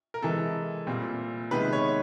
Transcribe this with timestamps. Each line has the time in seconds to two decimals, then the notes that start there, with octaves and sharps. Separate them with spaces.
0.14 A#4
0.22 C3 E3 G#3 A4
0.87 A#2 G3 C4
1.51 C3 D#3 G#3 B3 B4
1.73 C#5